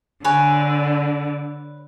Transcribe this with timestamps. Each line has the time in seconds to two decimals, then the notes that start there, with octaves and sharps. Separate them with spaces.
0.24 D3 B4 C#5 G#5